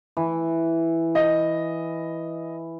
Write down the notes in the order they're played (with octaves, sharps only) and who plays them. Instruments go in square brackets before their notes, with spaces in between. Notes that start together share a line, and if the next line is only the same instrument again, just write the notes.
[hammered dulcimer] E3
[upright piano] D#5